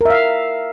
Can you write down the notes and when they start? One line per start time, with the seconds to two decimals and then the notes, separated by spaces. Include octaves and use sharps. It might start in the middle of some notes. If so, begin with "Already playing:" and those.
0.01 A#4
0.05 E5
0.10 F5